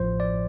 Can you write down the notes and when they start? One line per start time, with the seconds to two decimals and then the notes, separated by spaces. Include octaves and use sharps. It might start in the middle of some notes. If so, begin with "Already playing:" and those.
Already playing: A1 A2 F3 C5
0.20 D5